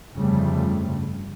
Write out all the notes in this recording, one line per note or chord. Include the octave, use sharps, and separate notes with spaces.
G1 F2 C#3 F3 G3 A3